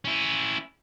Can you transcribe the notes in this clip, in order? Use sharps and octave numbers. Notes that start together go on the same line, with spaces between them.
C#4 E4